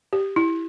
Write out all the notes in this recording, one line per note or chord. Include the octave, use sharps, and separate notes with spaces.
G4
E4